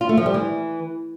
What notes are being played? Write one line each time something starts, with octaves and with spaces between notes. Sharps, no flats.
F4
A3
F3
G3
E3